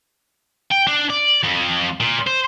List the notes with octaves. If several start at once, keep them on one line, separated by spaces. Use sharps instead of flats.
G5
D4
D5
F2
A#2
C5